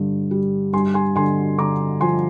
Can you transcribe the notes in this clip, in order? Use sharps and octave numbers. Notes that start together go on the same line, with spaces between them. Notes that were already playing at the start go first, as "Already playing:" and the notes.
Already playing: G2 D3
G3
G2 G#5 C6
G#5 C6
D3 G#5 C6
D3 A#5 D6
F3 G#5 C6